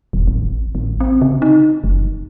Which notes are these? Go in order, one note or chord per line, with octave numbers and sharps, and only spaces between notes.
E1
A1
A1
C4
C#3
D#4
F#1